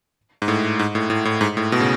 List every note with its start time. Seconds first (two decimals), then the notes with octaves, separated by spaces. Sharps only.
0.42 G#2
0.48 A2
0.79 G#2
0.95 A2
1.10 A2
1.25 A2
1.41 G#2
1.57 A2
1.72 B2
1.80 C#3